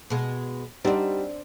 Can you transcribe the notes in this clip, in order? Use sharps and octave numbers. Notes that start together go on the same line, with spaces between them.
B2 G#3
G3 C4 D4 D#4 F#5